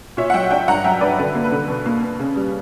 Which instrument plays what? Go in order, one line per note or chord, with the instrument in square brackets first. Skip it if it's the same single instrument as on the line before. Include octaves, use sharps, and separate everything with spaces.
[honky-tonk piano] A#2 C#5 E5
F#5
F#3 E5 G5
D4 E5 G5
G2 F#5 A#5
F#3 E5 G5
G2 B4 D5
D3 B4
A#3
B4
D3
B2
A#3
B2
C#3
G3